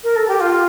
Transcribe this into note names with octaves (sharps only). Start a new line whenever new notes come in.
A#4
A4
G4
F4